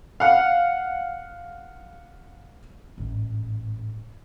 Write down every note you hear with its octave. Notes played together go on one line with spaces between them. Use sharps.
F5 F#5
A1 G#2